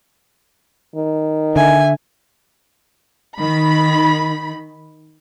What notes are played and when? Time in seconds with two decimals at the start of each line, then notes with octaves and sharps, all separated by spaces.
0.96 D#3
1.56 D3 E5 G#5
3.39 D#3 B5